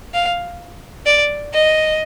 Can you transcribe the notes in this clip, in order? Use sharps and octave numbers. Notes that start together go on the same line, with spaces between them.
F5
D5
D#5